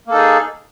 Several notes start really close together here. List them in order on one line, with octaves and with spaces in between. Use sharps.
A#3 A4 D#4 G#4